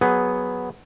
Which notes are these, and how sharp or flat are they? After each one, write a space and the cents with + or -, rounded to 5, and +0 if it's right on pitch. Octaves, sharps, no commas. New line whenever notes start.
F#3 +0 B3 +0 G#4 +0